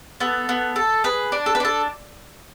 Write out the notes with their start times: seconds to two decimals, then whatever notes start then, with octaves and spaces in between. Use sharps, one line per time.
0.20 B3 A4
0.49 B3
0.76 A4
1.04 G#4 B4
1.32 D4
1.46 A4
1.55 B4
1.60 D4 A4